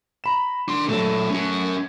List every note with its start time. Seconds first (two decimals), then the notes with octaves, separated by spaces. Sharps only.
0.24 A#5 B5 E7
0.68 D4 C6 D6
0.89 A#2 F#3 A3 A4
1.30 C#4 F#4